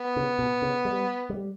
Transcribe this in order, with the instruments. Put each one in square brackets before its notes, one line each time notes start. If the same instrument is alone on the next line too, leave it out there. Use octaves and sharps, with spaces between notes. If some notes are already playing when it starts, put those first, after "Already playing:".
Already playing: [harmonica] B3
[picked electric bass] C#3
B2
C#3
G3
G3